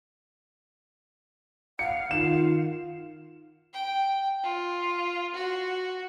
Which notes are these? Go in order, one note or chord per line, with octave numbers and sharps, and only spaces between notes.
F5 F#5 C#7
D#3 F4 E7
G5
F4
F#4